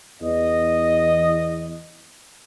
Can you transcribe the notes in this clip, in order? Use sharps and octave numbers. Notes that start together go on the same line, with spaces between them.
E2 D#5